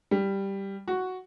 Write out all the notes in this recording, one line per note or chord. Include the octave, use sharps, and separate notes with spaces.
G3
F#4